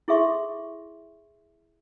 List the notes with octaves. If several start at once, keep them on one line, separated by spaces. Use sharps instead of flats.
E4 G#4 A4 E5 C6 C#6